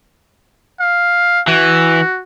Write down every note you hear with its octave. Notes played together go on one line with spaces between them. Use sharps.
F5
E3 F#4